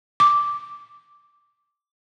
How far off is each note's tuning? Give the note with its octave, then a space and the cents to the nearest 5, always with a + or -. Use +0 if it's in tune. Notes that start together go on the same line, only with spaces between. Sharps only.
D6 -5